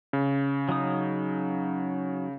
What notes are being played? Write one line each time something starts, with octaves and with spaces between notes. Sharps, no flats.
C#3
F#3 D#4 D#6